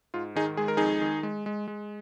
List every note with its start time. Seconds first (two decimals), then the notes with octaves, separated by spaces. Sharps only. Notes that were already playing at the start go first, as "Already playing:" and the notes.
0.14 G#2 F4
0.36 D#3 D#4 G#4
0.57 G#3 G#4
0.68 A#4
0.77 F2 D#4 G#4
1.01 D#3
1.23 G#3
1.46 G#3
1.68 G#3